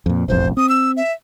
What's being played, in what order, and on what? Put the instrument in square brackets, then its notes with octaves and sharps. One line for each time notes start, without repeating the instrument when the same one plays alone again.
[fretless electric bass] F2 A#2
[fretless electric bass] E1 A1 F2 [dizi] C5
[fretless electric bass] C4 [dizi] D#6
[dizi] E6
E5